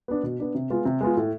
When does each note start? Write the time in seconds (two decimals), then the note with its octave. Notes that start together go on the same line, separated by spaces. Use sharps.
0.08 B3 D4
0.23 B2
0.40 B3 D4
0.55 C3
0.70 G#3 B3 F4
0.85 C3
1.01 G#3 B3 F4
1.17 A2